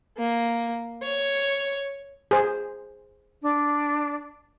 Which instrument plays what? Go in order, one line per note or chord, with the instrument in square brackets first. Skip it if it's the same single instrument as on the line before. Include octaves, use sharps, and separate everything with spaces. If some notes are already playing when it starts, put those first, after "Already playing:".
[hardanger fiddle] A#3
C#5
[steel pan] G#4 C5
[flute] D4